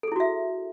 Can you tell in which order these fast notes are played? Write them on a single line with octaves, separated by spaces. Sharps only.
A4 G#4 E4 F#4 E5